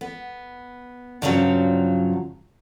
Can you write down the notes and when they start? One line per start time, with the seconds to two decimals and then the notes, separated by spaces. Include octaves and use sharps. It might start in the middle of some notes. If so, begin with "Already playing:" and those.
0.01 B3
1.22 G2 C#3 F3 F#3